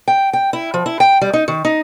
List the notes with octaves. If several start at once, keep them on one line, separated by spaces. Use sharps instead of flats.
G5
G5
E4
F3
E4
G5
G3
D#4
D#3
D#4